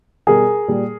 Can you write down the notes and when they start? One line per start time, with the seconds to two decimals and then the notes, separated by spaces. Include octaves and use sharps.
0.27 B2 G3 G#4 A#4
0.68 A#2 G3